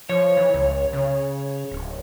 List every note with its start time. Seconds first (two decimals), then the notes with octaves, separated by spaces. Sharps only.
0.09 F3 C#5
0.37 E3
0.54 C#2
0.93 C#3
1.72 D1